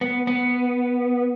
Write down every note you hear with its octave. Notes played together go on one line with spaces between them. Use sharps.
B3
B3